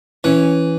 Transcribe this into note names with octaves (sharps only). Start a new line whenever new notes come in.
E3 C#4